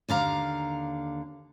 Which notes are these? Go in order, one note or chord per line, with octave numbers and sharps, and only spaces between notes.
D#2 D3 F5 A#5